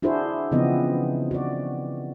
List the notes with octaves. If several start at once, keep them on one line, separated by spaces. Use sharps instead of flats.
D4 E4 F#4 G#4 C5
C#3 E3 F3 B3 C4 D#5
F#4 D5